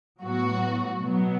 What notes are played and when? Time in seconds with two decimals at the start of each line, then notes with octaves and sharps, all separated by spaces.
0.23 A2 F#3 B3 F#4
1.03 B2 F#3 B3